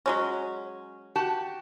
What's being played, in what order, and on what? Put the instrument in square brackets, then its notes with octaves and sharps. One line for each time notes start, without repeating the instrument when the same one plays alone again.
[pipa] F#3 G#3 C#4
[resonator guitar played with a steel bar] F#4 G4 A5